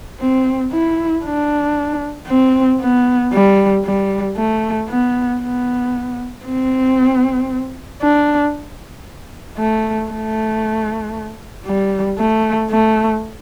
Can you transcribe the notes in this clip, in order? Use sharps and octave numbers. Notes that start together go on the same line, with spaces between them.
C4
E4
D4
C4
B3
G3
G3
A3
B3
B3
C4
D4
A3
A3
G3
A3
A3